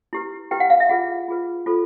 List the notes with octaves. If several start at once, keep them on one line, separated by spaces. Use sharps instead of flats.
E4 G4 B4
E4 G4 B4 G5
F#5
F5
E5
F4 G#4 B4 F#5
F4 G#4 B4
F4 A4 C5